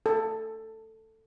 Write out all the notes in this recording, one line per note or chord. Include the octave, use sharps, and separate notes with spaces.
A4